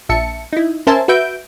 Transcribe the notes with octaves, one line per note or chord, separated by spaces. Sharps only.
A#1 E5 A5 C#7
D#4 E4
C#4 A#4 C5 E5 G#5 A5
F#4 B4 E5 G6 D7